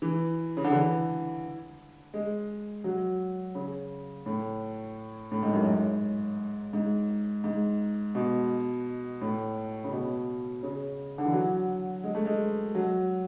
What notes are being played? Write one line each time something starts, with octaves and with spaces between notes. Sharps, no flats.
E3
C#3
D3
E3
G#3
F#3
C#3
A2
A2
G#2
F#2
G#2
G#2
G#2
B2
A2
C#3
B2
C#3
D3
E3
F#3
G#3
A3
G#3
F#3